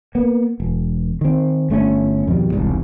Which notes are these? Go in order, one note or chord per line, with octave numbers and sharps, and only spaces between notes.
A#3 B3
E1
D#3 C4
G1 A3 C4 C#4
F2 B2 D#3 G3
E1 C2 G#2